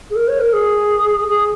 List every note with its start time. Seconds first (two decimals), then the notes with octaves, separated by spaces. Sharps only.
0.10 G#4
0.15 A#4
0.27 C#5
0.39 A#4
0.52 G#4
1.27 G#4